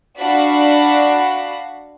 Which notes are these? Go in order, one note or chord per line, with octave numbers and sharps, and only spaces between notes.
D4 F#4 F5 F#5 B5